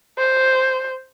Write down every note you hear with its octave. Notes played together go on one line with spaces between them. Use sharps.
C5